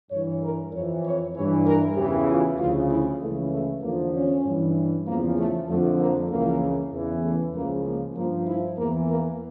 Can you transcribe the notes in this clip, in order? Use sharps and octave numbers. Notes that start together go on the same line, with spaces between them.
G2 E3 C#5
A#4
F2 E3 C#5
C#5
G2 E3 C#5
A#4
E2 C#3 E3 G4
F4
D2 C#3 F3 F4
E4
C#2 C#3 E3 A3
A3
E2 D3 F3 A#3
C#4
G2 E3
E2 C#3 F3 A#3
A3
F2 D3 F3 A3
A#3
C#2 C#3 E3 A#3
E2 C#3 E3
A3
C#2 C#3 F3 A#3
A#3
G2 F3 A#3
E4
E2 E3 A#3
A#3